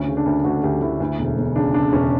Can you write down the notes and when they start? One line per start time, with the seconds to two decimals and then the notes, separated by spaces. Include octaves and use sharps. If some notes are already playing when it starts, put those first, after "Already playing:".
Already playing: D2 C#4
0.08 C#3
0.17 D4
0.26 D2
0.44 D2 F#4
0.63 D2 G4
0.82 D2 E4
1.00 D2
1.19 E1
1.38 E1
1.56 C#3 D4
1.74 C#3 D4
1.93 E1 C#4